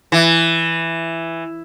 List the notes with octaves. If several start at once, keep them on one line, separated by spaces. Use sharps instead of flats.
E3